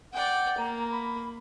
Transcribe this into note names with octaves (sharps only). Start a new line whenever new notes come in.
D5 F#5 G5
A#3 A#5
B5